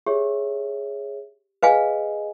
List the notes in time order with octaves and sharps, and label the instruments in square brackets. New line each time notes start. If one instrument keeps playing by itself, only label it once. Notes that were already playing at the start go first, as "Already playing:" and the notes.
[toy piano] G4 [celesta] G#4 C#5 E5
[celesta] G#4 D#5 [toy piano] B4 F5 G#5